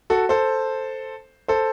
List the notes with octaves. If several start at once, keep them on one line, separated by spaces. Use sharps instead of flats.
F#4 A4
A4 C5
A4 C5